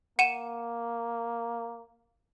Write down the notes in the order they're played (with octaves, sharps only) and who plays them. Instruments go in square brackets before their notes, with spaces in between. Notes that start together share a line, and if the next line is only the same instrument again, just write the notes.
[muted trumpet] A#3 [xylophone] F#5 D#7 E7